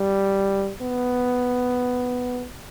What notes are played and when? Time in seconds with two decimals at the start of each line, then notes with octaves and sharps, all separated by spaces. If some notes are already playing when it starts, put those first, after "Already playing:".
Already playing: G3
0.82 B3